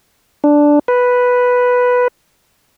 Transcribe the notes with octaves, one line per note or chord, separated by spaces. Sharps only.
D4
B4